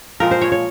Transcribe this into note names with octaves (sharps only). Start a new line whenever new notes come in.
A#2 F3 G#3 C4 A#4
C5
C#5
C#5